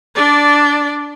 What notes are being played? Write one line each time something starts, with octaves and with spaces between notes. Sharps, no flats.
D4 D5